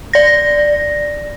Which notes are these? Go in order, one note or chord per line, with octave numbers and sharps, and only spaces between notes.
D5 A#6